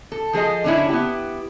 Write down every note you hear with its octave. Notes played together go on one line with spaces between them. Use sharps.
A4
F3 G#4 A4 D#5
D3 F#3 C#4 D4 E4
B3 E4 G4